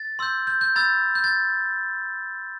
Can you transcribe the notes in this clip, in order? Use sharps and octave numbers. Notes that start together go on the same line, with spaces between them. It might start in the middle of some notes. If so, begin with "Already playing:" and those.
Already playing: A6
C6 E6 G6
G6
G6
B5 E6 G6 A6
G6
A6